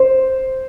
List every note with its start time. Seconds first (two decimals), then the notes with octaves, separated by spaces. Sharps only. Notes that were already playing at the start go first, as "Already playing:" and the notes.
Already playing: C5